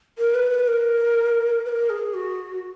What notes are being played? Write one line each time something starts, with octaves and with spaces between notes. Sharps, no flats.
A#4
B4
B4
A#4
B4
A#4
G#4
F#4